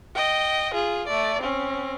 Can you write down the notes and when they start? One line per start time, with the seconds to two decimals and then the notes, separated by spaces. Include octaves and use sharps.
0.15 D#5 G5
0.74 F4 G#4
1.08 A3 D5
1.41 C4 C#4